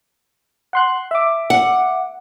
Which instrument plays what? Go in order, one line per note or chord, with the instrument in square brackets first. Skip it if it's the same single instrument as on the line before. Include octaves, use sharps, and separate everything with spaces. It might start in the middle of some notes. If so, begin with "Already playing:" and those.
[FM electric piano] F#5 C6 F#6
E5 D6
[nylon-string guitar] F#5